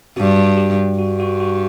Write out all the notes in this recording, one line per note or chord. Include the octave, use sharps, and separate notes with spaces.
G2 F#4
G4
G2 F#4
F#4
F#4